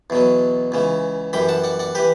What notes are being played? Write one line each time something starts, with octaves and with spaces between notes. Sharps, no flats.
E2 B2 F#3
C#2 C#3 E3
F#2 E3 G3 G5 B5
F#5 A5
D5 F#5
D5 F#5
E3 G4 B4